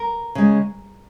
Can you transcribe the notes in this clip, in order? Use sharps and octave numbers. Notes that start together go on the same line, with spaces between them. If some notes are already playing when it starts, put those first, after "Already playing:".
Already playing: A#4
C#3 G#3